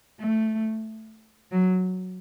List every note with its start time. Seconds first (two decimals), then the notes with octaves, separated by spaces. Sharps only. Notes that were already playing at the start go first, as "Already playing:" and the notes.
0.20 A3
1.52 F#3